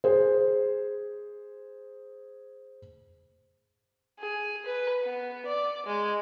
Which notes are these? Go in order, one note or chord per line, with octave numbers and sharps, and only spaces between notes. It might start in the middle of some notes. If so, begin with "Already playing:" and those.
G#4 C5
G#4
B4
B3
D5
G#3